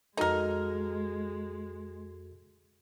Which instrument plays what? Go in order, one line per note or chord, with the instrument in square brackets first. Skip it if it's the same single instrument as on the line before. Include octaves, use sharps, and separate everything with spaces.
[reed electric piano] F2 F#4 A4 [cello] G#3 [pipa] D#4 A#4